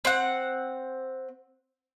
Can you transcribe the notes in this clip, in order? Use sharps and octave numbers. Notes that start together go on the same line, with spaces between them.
C4 F#5